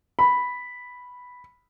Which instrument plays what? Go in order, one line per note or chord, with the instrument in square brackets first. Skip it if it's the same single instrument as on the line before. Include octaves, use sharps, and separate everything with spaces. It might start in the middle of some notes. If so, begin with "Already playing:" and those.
[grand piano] B5